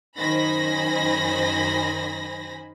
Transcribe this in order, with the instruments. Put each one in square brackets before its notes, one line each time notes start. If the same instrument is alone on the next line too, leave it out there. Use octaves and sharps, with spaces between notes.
[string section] F#2 D#3 C5 G#5 B5 A#6